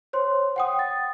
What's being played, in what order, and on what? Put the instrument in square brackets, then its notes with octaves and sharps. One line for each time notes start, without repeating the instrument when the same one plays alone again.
[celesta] C5 C#5 C6
F#5 G5 D#6
A6